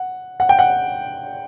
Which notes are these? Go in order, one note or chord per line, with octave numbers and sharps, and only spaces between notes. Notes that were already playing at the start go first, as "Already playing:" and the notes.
Already playing: F#5
F#5
G5
F#5